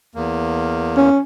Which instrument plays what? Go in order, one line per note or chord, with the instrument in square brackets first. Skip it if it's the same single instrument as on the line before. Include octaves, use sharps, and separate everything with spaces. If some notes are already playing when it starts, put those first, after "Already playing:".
[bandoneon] E2 A#3
[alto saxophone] C#4